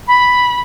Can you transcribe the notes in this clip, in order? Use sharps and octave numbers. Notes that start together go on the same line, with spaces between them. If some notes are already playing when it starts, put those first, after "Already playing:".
B5